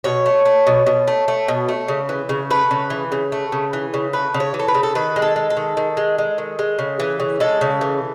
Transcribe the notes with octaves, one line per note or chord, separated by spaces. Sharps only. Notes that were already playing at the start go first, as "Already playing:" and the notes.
B2 C#5
A3
A3
B2
B2
A3
A3
B2
A3
C#3
E3
C#3
A3 B4
C#3
E3
C#3
A3
C#3
E3
C#3
A3 B4
C#3
C#5
E3
A4
B4
C#3
A4
D#3 B4
G#3
A4
G#3
A4
D#3
D#3
G#3
G#3
D#3
G#3
C#3
E3
C#3
G#3 A4
C#3
E3